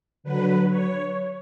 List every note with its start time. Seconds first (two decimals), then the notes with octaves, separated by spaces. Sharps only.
0.23 D3 F#3 B4
0.69 C#5